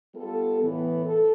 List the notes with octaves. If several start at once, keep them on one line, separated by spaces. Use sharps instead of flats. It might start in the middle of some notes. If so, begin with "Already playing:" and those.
G3 B3 F4 A4
A2 E3 B3
A4